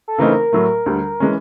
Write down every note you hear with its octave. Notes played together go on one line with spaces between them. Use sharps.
A4
C#3 E3 A3 C4 D#4 A#4
A2 F#3 A3
D2 D3 G3
E3 G#3 C#4